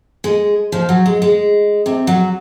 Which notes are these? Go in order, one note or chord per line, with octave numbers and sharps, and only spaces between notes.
G#3
F3
F#3
G#3
G#3
C3
F#3